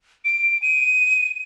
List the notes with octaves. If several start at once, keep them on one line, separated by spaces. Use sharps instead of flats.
D7
D#7